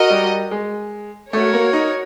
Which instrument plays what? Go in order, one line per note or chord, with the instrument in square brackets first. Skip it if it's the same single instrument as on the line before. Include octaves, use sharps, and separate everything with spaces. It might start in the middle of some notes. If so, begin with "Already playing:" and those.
Already playing: [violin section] F#4 A#4 D#5
[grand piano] G3
G#3
[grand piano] A3 [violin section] F#4 A#4 C#5
[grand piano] A#3
D#4